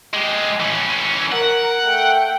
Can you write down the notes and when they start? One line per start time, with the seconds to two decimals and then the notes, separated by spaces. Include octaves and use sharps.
0.14 G#3 G4
0.60 E3 C#4
1.32 A#4 F#5
1.84 A3 G5